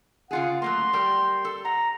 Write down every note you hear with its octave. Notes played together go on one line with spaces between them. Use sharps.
C#3 F4 G#4 F#5
F#3 A3 A#3 C6
G3 A#4 G5
A4
F#5 A#5